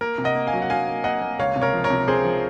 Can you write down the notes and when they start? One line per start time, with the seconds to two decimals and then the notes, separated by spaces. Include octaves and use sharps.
0.01 A#3 A#4
0.18 C3
0.24 D#5 F#5
0.35 A#3
0.47 F5 G#5
0.53 F#3
0.62 F#5
0.70 F#3 F5 G#5
0.88 A#3
1.04 A#3 D#5 F#5
1.22 A#3
1.39 C#2 C#5 F5
1.56 C3
1.61 A#4 C#5
1.73 F3
1.84 A#4 C#5
1.90 C3
2.08 C3 G#4 C5
2.25 F3